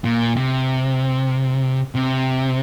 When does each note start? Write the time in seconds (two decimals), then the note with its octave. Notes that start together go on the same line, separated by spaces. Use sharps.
0.04 A#2
0.36 C3
1.95 C3